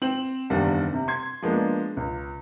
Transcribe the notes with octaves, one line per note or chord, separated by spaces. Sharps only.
C4 F#7
F#1 E2 D#3 G3 D4 F5
C3
C6 G#6
F3 G#3 A#3 B3 D4
C#2